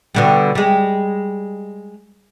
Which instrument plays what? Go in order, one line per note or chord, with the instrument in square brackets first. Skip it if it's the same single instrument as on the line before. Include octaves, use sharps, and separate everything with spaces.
[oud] B2 D3 G3
G3 G#3